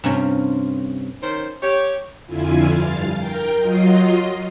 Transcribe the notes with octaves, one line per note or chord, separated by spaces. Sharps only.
G2 C3 C#4 F4
D#3 C#4 C5
G4 C#5
F2 D3 E4 F4 G#5
G2 F5 A6
A#4 G5
F#3 F4 D#5 C6